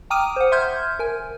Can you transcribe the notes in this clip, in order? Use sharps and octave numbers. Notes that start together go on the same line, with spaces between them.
G5 A#5 D6 D#6 F6 D#7
C5 F#5
E5 C6 F6 G6 G#6
A#4 G#5